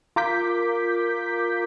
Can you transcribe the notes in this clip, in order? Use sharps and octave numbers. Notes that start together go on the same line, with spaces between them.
F4 A#4 D6 G6 B6